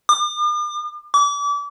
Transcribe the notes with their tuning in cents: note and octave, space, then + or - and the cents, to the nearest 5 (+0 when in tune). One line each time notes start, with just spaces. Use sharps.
D6 +45
D6 -35